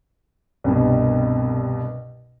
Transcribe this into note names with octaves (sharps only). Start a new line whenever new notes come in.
C2 G2 B2